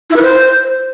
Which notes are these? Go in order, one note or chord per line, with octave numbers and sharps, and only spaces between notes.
E4
B4
C5